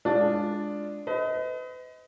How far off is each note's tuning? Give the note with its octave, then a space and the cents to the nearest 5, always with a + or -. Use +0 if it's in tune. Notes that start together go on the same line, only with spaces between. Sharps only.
G#3 +0 D4 +0 F4 +0
B4 +40 D#5 +25